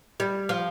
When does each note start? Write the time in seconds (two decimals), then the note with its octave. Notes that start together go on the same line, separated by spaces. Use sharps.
0.20 G3
0.49 F3